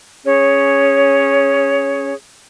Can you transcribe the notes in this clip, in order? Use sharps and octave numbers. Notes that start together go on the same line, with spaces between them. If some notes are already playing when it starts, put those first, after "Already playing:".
C#4 G#4 C#5